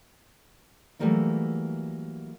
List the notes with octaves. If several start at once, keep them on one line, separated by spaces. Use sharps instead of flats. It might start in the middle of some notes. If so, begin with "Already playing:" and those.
E3 F#3 G3 A3 A#3 E4